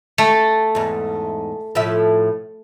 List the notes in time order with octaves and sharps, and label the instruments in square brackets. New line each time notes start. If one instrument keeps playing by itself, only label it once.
[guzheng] A3
[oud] E2 G#2
A2 F3 E5